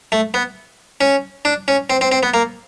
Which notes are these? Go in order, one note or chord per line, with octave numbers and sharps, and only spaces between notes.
A3
B3
C#4
D4
C#4
C4
C4
C4
B3
A#3